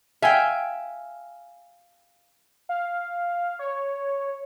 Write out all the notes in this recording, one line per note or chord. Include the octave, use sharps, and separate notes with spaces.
E5 F5 G5 G#5
F5
C#5